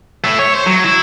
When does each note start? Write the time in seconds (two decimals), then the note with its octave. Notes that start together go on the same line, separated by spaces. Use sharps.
0.24 A3 E4
0.39 C#5
0.55 C5
0.67 F#3
0.84 E4